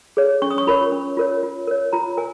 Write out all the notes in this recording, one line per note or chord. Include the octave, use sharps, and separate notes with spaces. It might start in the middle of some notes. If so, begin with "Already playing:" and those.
G#4 C#5
C#4 C#6
D#6
C#6
F4 A#4 C#5 B5
C#4
F4 A#4 C#5
F4
A#4 C#5
F4 A#5
A#4 G#5